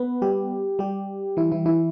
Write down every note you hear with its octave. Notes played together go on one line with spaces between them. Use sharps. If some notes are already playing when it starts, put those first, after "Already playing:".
Already playing: B3 B4
G3 G4
G3 G4
E3 E4
E3 E4
E3 E4